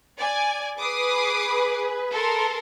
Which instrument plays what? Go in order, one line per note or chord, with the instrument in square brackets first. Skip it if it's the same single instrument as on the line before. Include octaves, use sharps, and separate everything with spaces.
[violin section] D5 G#5
[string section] G#4 B4 [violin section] D6 D#6 C7
[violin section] A4 A#4 C6